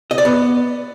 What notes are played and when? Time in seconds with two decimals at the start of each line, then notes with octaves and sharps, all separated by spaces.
0.11 D#5
0.18 D5
0.25 B3